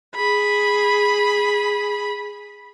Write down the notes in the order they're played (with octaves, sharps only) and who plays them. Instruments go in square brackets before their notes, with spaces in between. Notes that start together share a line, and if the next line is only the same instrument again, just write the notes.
[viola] G#4 B5